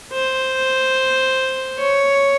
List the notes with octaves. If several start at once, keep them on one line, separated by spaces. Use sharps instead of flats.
C5
C#5